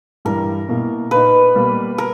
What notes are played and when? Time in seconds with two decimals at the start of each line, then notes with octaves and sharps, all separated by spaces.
0.25 G2 E3 G3 A#4
0.69 B2 A#3 E4
1.11 A#2 A#3 D#4 B4
1.55 B2 G3 A#3
1.98 A#4